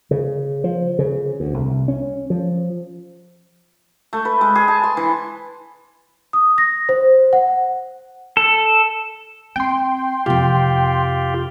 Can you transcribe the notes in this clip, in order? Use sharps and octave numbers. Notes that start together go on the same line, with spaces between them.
C#3
F3
C#3
D2
C2
C#4
F3
A3
B4
G#3
G#4
A5
C6
E3
D#6
A#6
C5
F#5
A4
C4 G5 C6
F2 C3 F4 G4